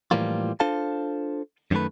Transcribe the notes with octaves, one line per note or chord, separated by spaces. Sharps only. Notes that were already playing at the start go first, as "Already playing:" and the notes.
A2 E3 F3 G3 A#3 F4
D4 F4 A4 C5 F5 A5
F#2 D#3 F3 A3 B4